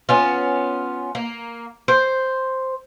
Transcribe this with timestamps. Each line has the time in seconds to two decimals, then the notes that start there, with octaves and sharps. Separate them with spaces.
0.09 B3 C#4 F4
1.15 A#3
1.88 C5